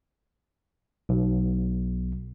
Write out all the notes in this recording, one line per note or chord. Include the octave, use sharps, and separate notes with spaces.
B1